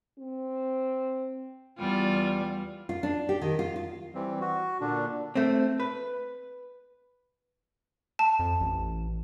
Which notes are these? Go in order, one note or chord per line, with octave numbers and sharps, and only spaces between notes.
C4
E2 G3 F4
F4
D4
G4
D#3
F4
F4
E3 G3 C4
F#4
A#2 D3 D4
A3 C4
B4
A5
F2
A1